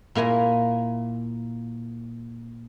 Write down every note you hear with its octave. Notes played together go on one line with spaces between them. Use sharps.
A#2 A#3 E4 G#5 A#5